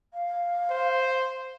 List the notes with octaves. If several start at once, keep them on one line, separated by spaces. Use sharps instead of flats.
F5
C5